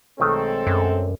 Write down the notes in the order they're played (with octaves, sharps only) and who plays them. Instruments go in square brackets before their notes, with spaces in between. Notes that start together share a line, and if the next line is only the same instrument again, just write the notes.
[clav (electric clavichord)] B1 D#3 A3 [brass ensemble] G#3 C4 A4
[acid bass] F#2